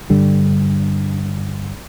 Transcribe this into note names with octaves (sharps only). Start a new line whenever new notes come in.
G2 D3 G3